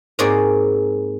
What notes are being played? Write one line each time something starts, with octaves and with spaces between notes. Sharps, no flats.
G#2 A#3 C4 G#4 C#5 D5